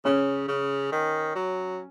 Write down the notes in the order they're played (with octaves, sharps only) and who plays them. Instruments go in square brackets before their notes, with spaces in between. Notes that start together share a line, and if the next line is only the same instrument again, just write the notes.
[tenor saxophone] C#3 [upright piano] C#4
[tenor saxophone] C#3
D#3
F#3